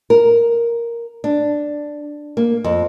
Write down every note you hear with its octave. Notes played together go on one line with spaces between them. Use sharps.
A#4
D4
A#3
F2